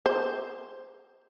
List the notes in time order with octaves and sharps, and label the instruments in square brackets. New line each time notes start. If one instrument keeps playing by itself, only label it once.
[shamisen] C5